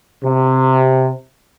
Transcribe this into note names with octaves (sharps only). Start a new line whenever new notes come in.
C3